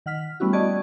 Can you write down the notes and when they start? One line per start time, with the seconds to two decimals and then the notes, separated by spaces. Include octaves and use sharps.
0.06 D#3 F#5 F6 B6
0.40 G3 A3 B3 C#4 E4 F#4
0.53 F#4 D5 D#5 A5 C#6 G#6